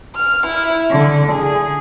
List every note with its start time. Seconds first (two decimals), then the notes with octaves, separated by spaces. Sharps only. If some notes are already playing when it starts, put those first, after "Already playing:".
0.15 F6
0.46 E4
0.90 D3
1.31 G#4